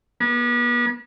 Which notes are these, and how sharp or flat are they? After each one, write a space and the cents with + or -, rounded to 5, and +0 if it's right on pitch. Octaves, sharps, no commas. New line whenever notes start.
B3 -35